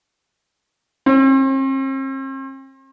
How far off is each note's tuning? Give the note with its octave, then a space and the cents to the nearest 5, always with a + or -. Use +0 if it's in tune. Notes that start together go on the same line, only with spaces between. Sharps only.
C4 +45